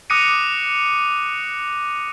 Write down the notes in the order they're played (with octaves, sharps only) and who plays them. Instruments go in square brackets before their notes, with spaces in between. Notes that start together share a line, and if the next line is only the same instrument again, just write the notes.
[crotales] D6 D#6 F#6 A#6 C#7 D#7